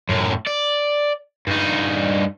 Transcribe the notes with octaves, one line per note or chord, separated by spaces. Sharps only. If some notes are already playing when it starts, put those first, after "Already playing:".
F#2 A2
D5
G2 D#4